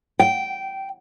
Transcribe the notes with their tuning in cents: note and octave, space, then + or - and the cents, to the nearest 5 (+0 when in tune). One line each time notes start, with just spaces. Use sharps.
G5 -10